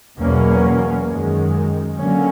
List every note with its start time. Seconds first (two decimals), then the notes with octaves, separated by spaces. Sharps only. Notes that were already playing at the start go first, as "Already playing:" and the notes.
0.18 E2 B2 F#3 A#3 C#4
1.08 F#2 D#3 G#3
1.98 D3 F#3 A#3 C#4